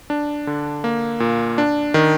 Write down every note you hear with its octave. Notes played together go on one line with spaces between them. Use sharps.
D4
D3
A#3
A#2
D4
D#3